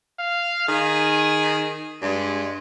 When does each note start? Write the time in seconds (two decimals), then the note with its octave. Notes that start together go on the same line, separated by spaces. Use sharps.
0.19 F5
0.68 D#3 G#4
2.02 G2 G#3